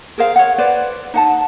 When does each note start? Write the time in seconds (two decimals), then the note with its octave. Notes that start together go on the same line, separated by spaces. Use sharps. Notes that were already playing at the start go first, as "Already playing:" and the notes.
0.18 G#4 A#4 C5 F5
0.36 C#5 F#5
0.58 B4 C5 D5
1.14 D#4 F#5 A5